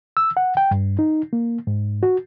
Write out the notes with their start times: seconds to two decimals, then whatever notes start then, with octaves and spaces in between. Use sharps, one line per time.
0.17 E6
0.37 F#5
0.57 G5
0.71 G2
0.99 D#4
1.33 A#3
1.67 G#2
2.03 F#4